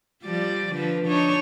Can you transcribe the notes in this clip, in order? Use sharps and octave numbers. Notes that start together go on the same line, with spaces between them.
F3 G3 D5
D3 F3 B4
D4 D#4 C#5